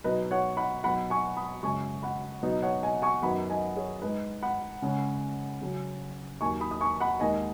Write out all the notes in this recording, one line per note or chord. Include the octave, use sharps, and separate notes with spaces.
B2 F#3 B3 D#4 B4 D#5
C#5 F#5
F#5 B5
B2 F#3 B3 D#4 F#5 B5
G#5 C#6
B5 D#6
F#2 C#3 G#3 C#4 G#5 C#6
F#5 B5
B2 F#3 B3 D#4
C#5 F#5
D#5 G#5
G#5 C#6
F#2 D#3 F#3 B3 D#4 F#5 B5
D#5 G#5
G#4 C#5
G#2 G#3 D#4 B4 D#5
F#5 B5
C#3 G#3 C#4
C#3 F#3 C#4
D#2 D#3 F#3 G#5 C#6
B5 D#6
D#6
G#5 C#6
F#5 B5
D#2 D#3 G#3 D#5 G#5